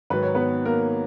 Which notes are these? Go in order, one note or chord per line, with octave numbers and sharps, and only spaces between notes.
G#2 D#3 F#3 B4
C#5
B3 B4
A#3 A#4